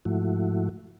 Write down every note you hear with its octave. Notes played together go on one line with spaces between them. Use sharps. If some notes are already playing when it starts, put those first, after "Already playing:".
G#2 F3 A3 E4 F#4